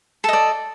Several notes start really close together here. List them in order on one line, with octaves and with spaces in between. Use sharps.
A4 D#5 D5